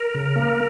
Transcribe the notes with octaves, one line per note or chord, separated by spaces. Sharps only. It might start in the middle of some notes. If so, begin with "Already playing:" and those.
Already playing: A#4
C#3
A#3